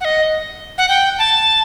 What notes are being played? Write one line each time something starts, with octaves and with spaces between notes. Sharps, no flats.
F#5
D#5
F#5
G5
A5